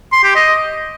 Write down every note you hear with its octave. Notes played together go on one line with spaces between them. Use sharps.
C6
G4
D#5